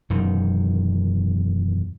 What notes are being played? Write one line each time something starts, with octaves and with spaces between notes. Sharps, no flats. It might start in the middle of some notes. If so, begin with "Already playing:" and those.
E1 F#2 D#3